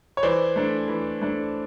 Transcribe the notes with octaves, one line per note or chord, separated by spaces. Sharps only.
C#5
E3 C5 D5
A3 D4
E3
A3 D4